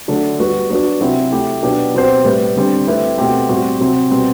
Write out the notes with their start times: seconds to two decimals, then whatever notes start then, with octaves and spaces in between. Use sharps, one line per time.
0.08 D3 F#3 A3 D4 A4
0.39 G3 B3 F#4 B4
0.70 F#3 B3 D4 F#4
1.01 C3 F#3 C4 E4
1.32 A3 E4 G4
1.63 B2 F#3 B3 D4 G4
1.94 B2 F#3 C4 G4 C5
2.25 A2 G3 B3
2.56 D3 G3 C4
2.87 A3 C4 E4 G4 B4
3.18 B2 A3 C4 G4
3.49 A2 G3 C4 F#4
3.80 C3 F#3 C4 G4
4.11 B2 G3 C4